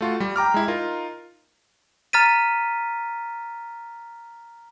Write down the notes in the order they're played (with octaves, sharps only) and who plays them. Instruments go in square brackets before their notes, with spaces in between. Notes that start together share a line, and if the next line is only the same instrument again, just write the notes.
[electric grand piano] A3 F4 F#4
G3
G5 A#5 D6 F6
G#3 E4
D#4 F4 A#4
[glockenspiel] A#5 F6 A6 B6 D#7